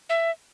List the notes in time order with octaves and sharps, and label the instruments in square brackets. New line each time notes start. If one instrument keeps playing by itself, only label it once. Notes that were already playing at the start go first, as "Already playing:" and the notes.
[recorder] E5